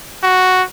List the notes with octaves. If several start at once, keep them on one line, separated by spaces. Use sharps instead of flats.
F#4